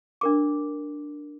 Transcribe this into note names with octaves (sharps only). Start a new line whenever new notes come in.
D4 A#4 D6